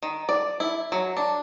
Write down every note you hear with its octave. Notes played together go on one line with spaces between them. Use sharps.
D#3
D5
E4
F#3
D4